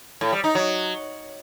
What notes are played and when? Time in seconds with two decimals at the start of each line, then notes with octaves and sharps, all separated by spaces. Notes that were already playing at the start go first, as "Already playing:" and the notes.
0.21 A2
0.32 G3
0.44 D#4
0.55 F#3